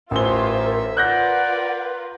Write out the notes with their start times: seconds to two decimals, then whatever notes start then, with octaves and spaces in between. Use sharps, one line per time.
0.11 A1 F4 A#4 C5 C#5 E5 G7
0.97 F4 A#4 B4 D5 F#5 F#6 G6 A#6